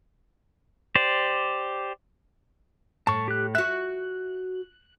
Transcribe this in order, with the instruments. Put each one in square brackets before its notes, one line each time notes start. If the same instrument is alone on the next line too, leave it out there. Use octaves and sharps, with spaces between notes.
[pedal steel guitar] G4 C5 D5
[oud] A2 [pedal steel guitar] A5 C#6
[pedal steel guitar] G4 F#6
[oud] F#4 E5 [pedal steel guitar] F#6